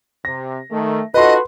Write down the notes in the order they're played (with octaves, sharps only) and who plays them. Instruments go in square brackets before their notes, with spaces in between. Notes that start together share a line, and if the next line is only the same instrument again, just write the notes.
[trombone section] C3 [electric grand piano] A#6
[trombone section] D#3 [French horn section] A3
[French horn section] D#4 F4 A4 [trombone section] F#4 [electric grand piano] B4 C6 [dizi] D#5